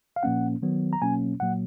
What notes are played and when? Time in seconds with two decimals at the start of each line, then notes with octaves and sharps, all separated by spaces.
0.16 F5
0.23 A#2 F3 A#3 C#4 F#5
0.62 D#3 F#3 B3
0.93 A#5
1.01 B2 F#3 A#3 C#4 G#5
1.40 A#2 F#3 A#3 F#5